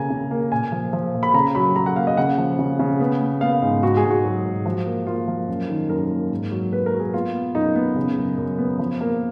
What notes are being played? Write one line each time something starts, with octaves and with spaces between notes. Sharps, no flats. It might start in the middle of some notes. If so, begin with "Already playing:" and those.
Already playing: C#3 A#3 G#5 A#5
C#3
A#3
A#2 G#5
F3
F3
A#2
B5
C#3 A#5
F#3 B5
F#3 A#5
F#5
A#3 F5
D#5
C#3 F#5
F3
C#3
C#3
B3
B3
B3 F5
G#2
G#2 F#4
G#4
G#2
F#4
F#3
G#2
F3
A#3
A#3 F4
F3
F#2
D#3
F#2 A#4
A#3
G#2
F#3
A#3 B4
A#4
F#3
G#4
B3 F4
B3
F#2 D#4
B3
C#3
F#2
F#2
B3
F3
A#3